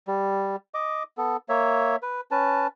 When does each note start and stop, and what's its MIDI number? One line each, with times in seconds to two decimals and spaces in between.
0.08 0.56 55
0.74 1.03 75
0.74 1.03 86
1.17 1.37 59
1.17 1.37 69
1.49 1.96 58
1.49 1.96 73
1.49 1.96 76
2.03 2.21 71
2.31 2.67 61
2.31 2.67 71
2.31 2.67 81